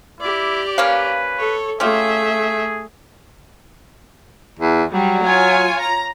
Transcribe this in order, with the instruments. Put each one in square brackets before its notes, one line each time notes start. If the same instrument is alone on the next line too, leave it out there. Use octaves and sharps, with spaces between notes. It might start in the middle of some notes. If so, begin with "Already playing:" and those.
[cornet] E4 [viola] G4 D5
[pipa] A#3 C#4 F5 [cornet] B4
[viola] A4 C#5
[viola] A3 E5 [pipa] C#4 F4 G4 [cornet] G#4
[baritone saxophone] E2
[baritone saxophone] F#3 [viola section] G3
[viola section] F4 C#5 G#5
A#5